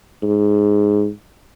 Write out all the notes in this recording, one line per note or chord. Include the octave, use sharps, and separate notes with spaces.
G#2